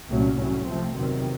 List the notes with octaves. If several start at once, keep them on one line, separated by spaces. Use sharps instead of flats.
C2 A#2 F#3 A3 C#4
A2 F#3 A3 C#4
C3 F3 A3 C4
E2 C3 D#3 F#3